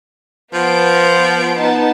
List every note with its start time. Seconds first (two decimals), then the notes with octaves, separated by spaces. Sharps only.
0.53 F3 B3 D7
1.57 B3 D#4 A5